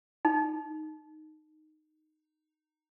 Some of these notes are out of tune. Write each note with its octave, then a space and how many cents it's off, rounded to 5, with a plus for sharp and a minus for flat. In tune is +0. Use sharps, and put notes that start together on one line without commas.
D#4 -10